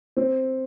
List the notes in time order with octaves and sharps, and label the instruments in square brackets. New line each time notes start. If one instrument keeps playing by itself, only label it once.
[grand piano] C4